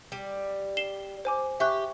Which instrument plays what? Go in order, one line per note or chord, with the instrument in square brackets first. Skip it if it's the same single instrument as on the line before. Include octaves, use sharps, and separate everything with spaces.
[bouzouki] G3
[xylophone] C7 E7 G7
C5 G#5 D6
[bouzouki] G4 [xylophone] E5 C#6 F#6